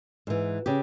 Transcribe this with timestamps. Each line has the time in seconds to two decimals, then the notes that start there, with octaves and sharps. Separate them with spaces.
0.27 G#2 E3
0.66 C#3 G4